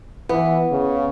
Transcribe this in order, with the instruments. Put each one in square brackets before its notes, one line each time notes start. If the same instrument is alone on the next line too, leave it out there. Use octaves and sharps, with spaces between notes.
[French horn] E3 [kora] B3
[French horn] C#3